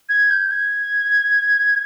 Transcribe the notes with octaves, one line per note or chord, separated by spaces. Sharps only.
G#6
G6
G#6